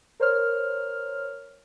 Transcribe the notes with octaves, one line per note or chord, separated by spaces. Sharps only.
A#4 C5 C#5 F6